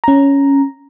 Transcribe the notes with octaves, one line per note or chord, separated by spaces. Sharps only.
C#4 A#5